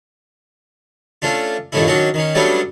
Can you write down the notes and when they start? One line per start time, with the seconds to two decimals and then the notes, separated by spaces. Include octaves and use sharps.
1.22 A3 C#4 D4 F4
1.72 G2 A#2 D#3 A3 C#4 E4
1.87 D#3 F#3 C#4 D4 F#4
2.14 D#3 C#4
2.35 F#3 G3 A3 B3 C#4 D4